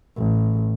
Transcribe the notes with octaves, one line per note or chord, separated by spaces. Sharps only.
A1